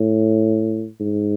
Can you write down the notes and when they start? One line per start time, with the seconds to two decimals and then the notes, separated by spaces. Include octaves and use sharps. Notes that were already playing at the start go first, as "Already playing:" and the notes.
Already playing: A2
1.00 G#2